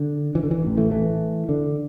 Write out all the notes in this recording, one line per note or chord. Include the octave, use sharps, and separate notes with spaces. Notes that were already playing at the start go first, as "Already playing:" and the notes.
Already playing: D3
E3
D3
E3
A1 A2
E3 A3
E3 A3
D3